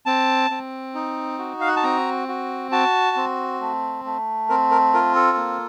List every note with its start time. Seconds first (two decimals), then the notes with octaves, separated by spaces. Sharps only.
0.06 C4 A5
0.50 C4
0.95 D#4
1.39 F#4
1.61 F5
1.67 F#5
1.76 A5
1.83 C4 A#5
2.28 F#4
2.72 F#4 A5
3.17 C4
3.60 A3
4.05 A3
4.49 C4 A#4
4.71 A#4
4.93 F4 A#4
5.15 A4
5.37 A#3